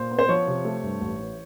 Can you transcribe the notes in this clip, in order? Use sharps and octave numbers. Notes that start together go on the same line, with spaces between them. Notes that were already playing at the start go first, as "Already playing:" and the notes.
Already playing: A#2 C5
B3
C5
F3 C#5
C3
A3
G2
A1
E3